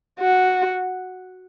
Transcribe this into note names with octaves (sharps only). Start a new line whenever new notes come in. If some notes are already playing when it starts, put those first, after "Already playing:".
F#4